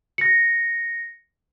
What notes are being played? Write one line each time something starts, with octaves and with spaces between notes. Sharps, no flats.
A#6 C#7